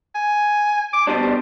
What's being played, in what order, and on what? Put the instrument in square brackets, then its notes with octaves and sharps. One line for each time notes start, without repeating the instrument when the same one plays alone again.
[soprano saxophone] G#5
D6
[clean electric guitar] B2 G3 D4 [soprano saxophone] C5